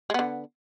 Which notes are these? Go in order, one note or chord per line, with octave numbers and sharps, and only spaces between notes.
D3 G#3 B3